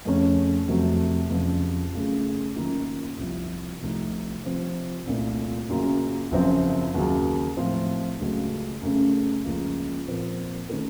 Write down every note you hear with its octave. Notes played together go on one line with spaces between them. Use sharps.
F2 C#3 A3 C#4
F2 C3 F#3 A3
F2 C#3 F3
F#2 C#3 A3
F#2 D#3 A#3 F4
C2 C3 F3
C2 C3 F3 A3 D#4
C3 F3 C4
C2 A#2 A3
F#2 C#3 F#3 A#3 F4
F#1 F#2 F3 C4 F4
D#2 C#3 F#3
A2 F3 C4 F4
C#2 C#3 F#3 A3
F#2 C#3 A3
C#2 C#3 F3 A#3 F4
A#2 F3 C4 F4 A#4
D#3 A3 C#4 A4